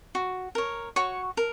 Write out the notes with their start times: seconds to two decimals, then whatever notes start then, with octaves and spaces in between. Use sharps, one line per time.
0.15 F#4
0.55 A#4 C#5
0.96 F#4 C#5 C#6
1.37 A#4